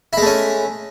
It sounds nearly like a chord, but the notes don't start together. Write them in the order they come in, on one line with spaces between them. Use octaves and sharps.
E4 G#3 A3 C#4